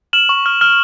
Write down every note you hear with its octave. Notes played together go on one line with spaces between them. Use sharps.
F6 E7 F#7
C#6
F6
F6